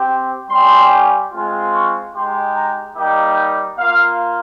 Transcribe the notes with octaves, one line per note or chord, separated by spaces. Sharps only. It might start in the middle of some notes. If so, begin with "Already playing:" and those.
Already playing: C4 G4
G3 C#4 G4 C6
G#3 C4 F4
C#6
G#3 D#4 G4 C6
A#5
G3 A#3 D#4 G4 G5
A#3 F4 F5